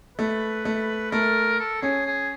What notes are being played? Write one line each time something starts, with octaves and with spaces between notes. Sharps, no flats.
A3 B4
A3
A3 A#4
A4
C#4 G#4
G#4